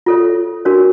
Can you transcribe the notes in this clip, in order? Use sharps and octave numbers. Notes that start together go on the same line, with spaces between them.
F4 A4 C#5
D4 F#4 A#4 C#5